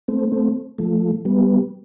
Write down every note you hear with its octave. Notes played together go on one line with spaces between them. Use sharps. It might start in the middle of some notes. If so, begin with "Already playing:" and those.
A3 C4
A3 C4
F3 A3
G3 B3